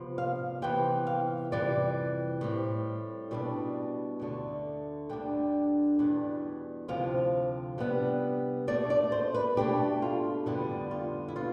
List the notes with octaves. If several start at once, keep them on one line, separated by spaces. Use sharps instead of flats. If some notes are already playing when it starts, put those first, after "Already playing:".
Already playing: C3 F3 B3
F5
C3 E3 B3 G5
F5
F2 C3 E3 G3 D5
A2 G3 C4
B2 G3 B3 D4
D2 D3 A3 D4
D2 D3 G3 D4 G5
E2 B2 G3 D4
D2 C3 F3 C4 F5
C3 G3 B3 D4
B2 A3 D4 D5
D5
C5
B4
B2 A3 D4 G4
F4
F2 D3 G3 B3 E4
F4
E4
B2 B3 F4